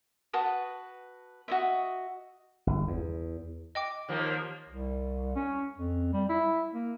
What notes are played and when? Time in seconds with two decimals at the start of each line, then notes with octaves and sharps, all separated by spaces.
0.33 F#4 B4 A5 D#6
1.48 F#4 D#5 E5
2.67 G1
2.87 E2
3.75 D#5 G5 D6
4.09 D#2 F3 A#3
4.69 C2
5.36 C#4
5.78 F2
6.13 G3
6.29 E4
6.74 A#3